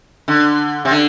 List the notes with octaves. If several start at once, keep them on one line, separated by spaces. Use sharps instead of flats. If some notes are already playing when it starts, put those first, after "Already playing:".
D3
C3
D3